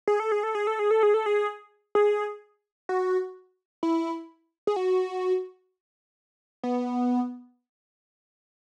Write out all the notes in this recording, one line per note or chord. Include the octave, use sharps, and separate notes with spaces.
G#4
A4
G#4
A4
G#4
A4
G#4
A4
G#4
A4
G#4
G#4
F#4
E4
G#4
F#4
B3